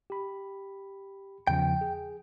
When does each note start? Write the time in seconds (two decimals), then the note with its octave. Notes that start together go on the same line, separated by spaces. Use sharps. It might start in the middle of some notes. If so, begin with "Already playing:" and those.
0.10 G4 B5
1.47 E2 C#3 F3 G5
1.81 G#4